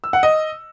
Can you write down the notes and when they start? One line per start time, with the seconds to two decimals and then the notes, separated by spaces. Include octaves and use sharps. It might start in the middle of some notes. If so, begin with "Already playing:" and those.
0.04 E6
0.13 F#5
0.23 D#5